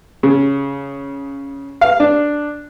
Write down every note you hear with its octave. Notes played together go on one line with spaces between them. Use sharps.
C#3
F5
D4